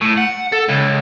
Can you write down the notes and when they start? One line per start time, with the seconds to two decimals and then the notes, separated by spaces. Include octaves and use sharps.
0.01 A2
0.18 F#5
0.52 A4
0.68 C#2